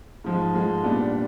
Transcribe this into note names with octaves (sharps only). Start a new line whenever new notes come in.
G#2 F3 G#3
G#2 F3 G#3
A#2 G3 B3 D4